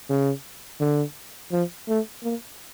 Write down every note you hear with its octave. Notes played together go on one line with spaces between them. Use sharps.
C#3
D3
F3
A3
A#3